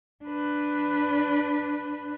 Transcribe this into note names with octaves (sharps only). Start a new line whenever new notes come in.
D4 B4